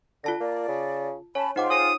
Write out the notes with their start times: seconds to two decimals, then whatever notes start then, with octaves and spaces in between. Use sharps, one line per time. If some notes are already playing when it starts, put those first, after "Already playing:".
0.24 D3 F4 A5 A#6
0.41 A#3 D5
0.68 C#3
1.35 C#4 C#5 A5 B5
1.56 G#2 D#4 F4 C5 F#5 G5 D6
1.70 G#4 C#5 D#6